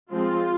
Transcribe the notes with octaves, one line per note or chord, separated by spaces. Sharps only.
F3 G#3 C4 F4